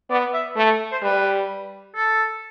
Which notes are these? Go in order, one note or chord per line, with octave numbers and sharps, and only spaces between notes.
B3 D5
E5
A3 E5
C5
G3 B4
A4